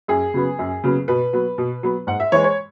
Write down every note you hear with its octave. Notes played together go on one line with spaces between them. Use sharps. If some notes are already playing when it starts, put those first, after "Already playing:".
F#2 G#4
C#3 F#3 B3
F#2
C#3 F#3 B3
B2 B4
F#3 B3
B2
F#3 B3
G#2 F#5
E5
E3 G#3 C#5
C#5